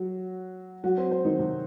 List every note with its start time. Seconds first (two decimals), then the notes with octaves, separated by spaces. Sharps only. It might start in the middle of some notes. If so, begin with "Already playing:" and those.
Already playing: F#3 F#4
0.84 F#3 F#4
0.97 C4 C5
1.11 C4 C5
1.25 D#3 D#4
1.39 C3 C4